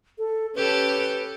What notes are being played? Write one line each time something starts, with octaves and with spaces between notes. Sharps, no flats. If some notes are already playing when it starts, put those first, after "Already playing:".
A4
C#4 G4 A4 B4